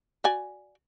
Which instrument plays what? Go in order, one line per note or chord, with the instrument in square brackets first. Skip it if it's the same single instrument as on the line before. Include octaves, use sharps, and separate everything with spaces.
[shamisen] F#4 D5 G#5